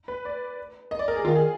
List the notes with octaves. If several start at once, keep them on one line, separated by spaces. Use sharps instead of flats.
B4
D5
D#5
D5
A#4
G#4
D#3 F4
G#4